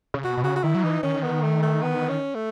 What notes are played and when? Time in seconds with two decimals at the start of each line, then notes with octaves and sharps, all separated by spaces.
0.14 C#3
0.24 B2 F#4
0.37 B2
0.43 C#3 F#4
0.56 F#4
0.64 D#3 E4
0.75 F#3
0.83 E3 D#4
1.03 D#3 C#4
1.23 B3
1.43 A3
1.63 A3
1.82 B3
2.09 C#4
2.35 A3